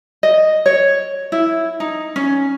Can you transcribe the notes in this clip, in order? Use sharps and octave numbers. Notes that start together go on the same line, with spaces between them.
D#5
C#5
E4
D#4
C#4